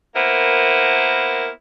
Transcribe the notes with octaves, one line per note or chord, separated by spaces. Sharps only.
A#3 B3 E4 A#4 C5